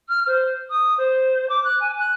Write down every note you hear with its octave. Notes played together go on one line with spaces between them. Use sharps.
F6
C5
D#6
C5
D6
F#6
G#5
F#6